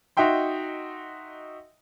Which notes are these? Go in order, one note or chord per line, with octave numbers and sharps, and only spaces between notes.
D#4 F#4 D#5 E5 G5 C6